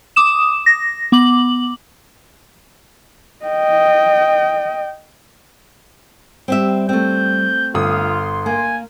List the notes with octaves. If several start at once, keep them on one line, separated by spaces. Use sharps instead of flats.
D6 D#6 E7
A#6
B3 D6 F#7
D#5 G5
G3 C4 G4 E5
A3 C4 G6
G1 F4 D#6
C6
A#3 G#5